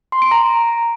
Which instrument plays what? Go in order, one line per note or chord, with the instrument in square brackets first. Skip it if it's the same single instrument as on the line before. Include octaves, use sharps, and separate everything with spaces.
[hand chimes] C6
D7
A#5